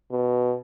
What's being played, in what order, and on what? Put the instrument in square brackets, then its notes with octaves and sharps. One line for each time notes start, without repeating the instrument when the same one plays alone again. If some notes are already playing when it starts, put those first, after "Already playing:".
[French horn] B2